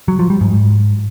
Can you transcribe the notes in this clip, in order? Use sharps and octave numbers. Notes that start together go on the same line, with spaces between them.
F#3
F3
G3
G#2